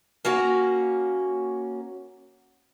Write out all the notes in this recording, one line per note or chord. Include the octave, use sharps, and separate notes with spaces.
A#3 C#4 F#4